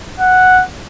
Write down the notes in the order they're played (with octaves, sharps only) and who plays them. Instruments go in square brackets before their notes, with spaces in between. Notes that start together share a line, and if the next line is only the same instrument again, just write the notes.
[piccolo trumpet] F#5